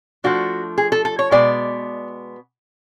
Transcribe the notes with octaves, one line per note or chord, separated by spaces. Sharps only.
F3 A3 D4 F#4
G#4
A4
A4
C#5
B2 G#3 B3 D5